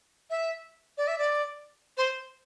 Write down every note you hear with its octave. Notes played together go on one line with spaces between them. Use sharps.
E5
D5
E5
D5
C5